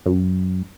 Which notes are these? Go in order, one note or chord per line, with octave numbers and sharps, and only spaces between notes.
F#2